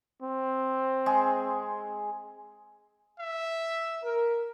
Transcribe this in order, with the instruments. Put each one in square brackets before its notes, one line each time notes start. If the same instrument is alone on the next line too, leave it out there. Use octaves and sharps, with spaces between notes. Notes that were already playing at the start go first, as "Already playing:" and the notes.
[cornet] C4
[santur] G#3 G#4
[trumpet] E5
[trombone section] A#4